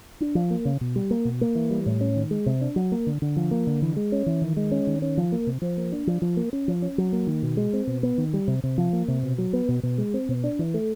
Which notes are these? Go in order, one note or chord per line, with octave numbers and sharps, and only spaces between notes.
D4
F3
A#3
C#3
B2
G3
A#3
B2
A#3
E3
G3
A2
C#4
D#3
G#3
C3
D4
F#3
A#3
D3
D3
F3
A#3
D3
E3
G#3
C#4
E3
D#3
G#3
C#4
D#3
C#4
F3
A#3
C3
F3
A#3
D4
F3
F3
A#3
C#4
F3
C#4
F#3
A#3
D#3
B2
G#3
C4
B2
B3
D#3
G3
C3
C3
F3
A#3
C3
B2
F#3
B3
B2
B2
G#3
C4
B2
D4
E3
A3